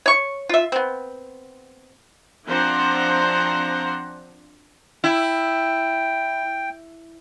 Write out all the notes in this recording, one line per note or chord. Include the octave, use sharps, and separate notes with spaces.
C#5 C#6
F4 E5
B3 C4
F3 C4 D4 C5 F#5 A#5
E4 G5